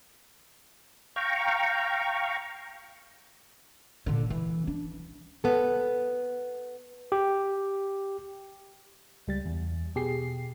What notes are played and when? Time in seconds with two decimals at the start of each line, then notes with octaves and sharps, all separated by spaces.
1.16 F5 G5 A#5 C#6
4.06 A#2 D3
4.30 E3
4.67 D4
5.44 B3 A4
7.12 G4
9.27 C#2 G3 A6
9.46 E2
9.95 B2 G4 G#4 C7